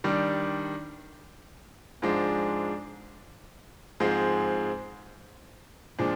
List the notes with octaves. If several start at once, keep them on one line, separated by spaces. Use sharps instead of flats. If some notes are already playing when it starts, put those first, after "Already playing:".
D#3 G3 D4
G#2 F3 G#3 D4
G#2 F3 G#3 C4
A#2 F3 G#3 D4